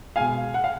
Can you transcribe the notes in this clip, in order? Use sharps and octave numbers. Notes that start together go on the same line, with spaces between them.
B2 G#3 F5 G#5
F#5
F5